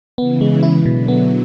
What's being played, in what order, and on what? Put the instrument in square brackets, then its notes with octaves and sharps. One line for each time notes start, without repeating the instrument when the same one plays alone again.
[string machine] C#3 E3 [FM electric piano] B3
[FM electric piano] G#3
E4
[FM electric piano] B2 [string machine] D3 F#3
[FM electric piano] B3